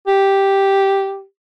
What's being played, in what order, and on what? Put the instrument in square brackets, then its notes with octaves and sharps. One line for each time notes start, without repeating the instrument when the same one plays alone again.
[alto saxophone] G4